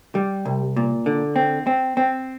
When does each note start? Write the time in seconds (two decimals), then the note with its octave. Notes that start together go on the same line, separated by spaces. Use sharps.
0.15 G3
0.45 C2
0.76 A#2
1.06 D3
1.36 C4
1.67 C4
1.97 C4